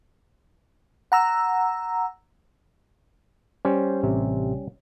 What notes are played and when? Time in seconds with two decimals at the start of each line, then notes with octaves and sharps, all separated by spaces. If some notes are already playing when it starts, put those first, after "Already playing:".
1.12 F#5 A#5 E6
3.65 G3 C#4 C5
4.03 A1 C3